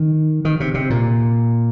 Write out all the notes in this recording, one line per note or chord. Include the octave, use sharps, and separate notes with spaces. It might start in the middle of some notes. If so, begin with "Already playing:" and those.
Already playing: D#3
D#3
C3
C3
A#2